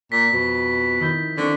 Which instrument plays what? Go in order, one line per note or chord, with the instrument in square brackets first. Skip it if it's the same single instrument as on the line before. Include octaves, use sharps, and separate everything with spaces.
[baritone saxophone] A#2 [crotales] B6
[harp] F2 [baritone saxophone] B2
[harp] D#3 E4 G6
[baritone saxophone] D3 [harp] C4 C#4